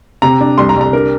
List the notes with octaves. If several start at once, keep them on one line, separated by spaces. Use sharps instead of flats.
C3 A#5
D4
C2 C6
A#5
C2
A#5
D4 A#4